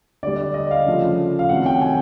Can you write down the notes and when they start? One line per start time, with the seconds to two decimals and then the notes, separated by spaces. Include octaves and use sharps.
0.23 D3 G3 D5
0.54 D#5
0.71 F5
0.86 C#3 F3 A3
1.39 F5
1.49 C3 D#3 F#3 A3 F#5
1.66 G5
1.81 G#5